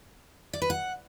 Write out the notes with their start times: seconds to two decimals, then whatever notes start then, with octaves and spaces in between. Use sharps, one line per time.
0.53 D5
0.62 B4
0.70 F#5